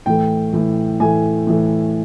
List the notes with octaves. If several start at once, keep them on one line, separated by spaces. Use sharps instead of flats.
A2 E3 A3 G5
A2 E3 A3
A2 E3 A3 G#5
A2 E3 A3